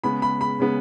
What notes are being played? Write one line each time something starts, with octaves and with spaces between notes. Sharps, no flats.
C#3 G#3 B3 B5
B5
B5
C#3 G#3 B3